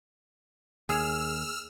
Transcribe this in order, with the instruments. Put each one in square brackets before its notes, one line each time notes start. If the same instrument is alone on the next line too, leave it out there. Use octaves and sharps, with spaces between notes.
[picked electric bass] D#2 [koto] G#4 [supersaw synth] E6 F6